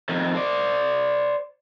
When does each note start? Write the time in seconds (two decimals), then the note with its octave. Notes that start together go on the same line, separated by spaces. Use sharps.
0.09 F2 D#3
0.35 C5 D5